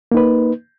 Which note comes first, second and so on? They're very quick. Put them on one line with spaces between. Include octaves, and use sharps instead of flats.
A#3 D#4 B4